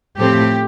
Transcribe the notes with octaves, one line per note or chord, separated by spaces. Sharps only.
A2 F3 A3 C4 G4